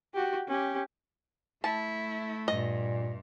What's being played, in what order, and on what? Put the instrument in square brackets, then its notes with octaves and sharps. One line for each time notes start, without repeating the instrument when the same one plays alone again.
[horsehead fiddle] F#4 G4
C#4 G4
[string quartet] A3 [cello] E4 [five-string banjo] A5
[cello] G2 [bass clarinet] A#2 [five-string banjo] D#5